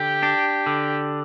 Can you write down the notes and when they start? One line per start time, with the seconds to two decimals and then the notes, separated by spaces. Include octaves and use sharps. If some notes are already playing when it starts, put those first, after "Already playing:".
Already playing: D3 G4
0.23 D4
0.66 D3